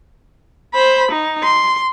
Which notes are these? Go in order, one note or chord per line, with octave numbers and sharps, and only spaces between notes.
C5 B5
D#4
C6